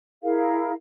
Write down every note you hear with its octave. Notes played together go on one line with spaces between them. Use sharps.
E4 G#4 A#4 F5